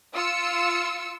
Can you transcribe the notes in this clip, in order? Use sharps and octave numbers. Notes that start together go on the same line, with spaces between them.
F4 E6 C#7